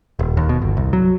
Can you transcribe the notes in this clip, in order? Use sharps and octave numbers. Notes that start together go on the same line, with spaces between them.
D#1
D#2
B2
G1
C2
F#3